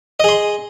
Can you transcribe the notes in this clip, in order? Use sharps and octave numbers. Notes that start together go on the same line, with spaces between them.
G#4 D#5 C6